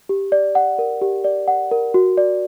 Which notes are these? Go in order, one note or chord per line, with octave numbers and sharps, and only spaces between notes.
G4
D5
F#5
A#4
G4
D5
F#5
A#4
F#4
D5